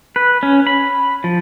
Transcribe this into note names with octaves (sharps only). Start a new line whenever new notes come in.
B4
C#4
B5
F3